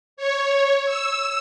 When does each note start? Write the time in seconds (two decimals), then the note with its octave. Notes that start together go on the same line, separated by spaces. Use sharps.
0.17 C#5
0.85 E6